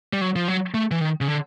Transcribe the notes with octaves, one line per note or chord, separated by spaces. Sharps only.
G3
F#3
F3
F#3
A3
E3
D#3
C#3
D3